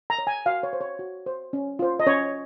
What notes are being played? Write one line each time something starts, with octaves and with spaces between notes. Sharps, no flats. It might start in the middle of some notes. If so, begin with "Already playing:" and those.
A#5
C#5
G#5
F#4 F5
C#5
C5
C#5
F#4
C5
C#4
F4 C5
D#5
C#4 C#5